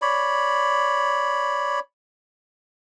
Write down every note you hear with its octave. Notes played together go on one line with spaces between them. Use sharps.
C#5 D5 B5